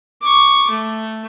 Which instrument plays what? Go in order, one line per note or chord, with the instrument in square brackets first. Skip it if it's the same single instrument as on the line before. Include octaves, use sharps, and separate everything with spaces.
[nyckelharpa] C#6 D6
A3